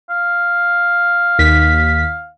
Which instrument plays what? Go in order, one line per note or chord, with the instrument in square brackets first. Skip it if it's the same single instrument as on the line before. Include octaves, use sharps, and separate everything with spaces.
[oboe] F5
[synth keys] D#2 B6